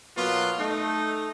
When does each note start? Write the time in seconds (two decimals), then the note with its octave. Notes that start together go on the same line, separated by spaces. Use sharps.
0.16 B2 F#3 A#3 B3 F4
0.59 A3 D#4